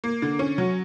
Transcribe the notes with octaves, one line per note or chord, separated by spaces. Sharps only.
A#3
D3
C#4
F#3